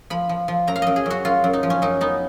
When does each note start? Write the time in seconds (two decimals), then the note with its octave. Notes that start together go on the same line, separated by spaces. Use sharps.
0.10 F3 B5
0.29 F3
0.48 F3
0.67 F#2 A#5
0.76 F5
0.82 F#2 D#5
0.96 G#4
1.06 F#2 F#4
1.25 F#2 F4
1.44 F#2
1.53 D#4
1.63 F3
1.70 C#4
1.82 F#2 D#4
2.01 B3 D#4